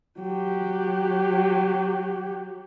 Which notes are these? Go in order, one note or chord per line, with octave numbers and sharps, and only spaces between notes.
F#3 G4